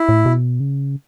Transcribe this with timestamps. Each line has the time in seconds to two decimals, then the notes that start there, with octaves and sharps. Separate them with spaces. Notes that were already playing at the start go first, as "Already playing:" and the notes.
Already playing: E4
0.09 A2
0.26 B2
0.60 C#3